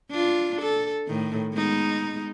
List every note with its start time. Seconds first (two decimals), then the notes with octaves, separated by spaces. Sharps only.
0.10 D4 F4
0.62 A4
1.07 A2 D#3
1.54 G#3 B3 D#4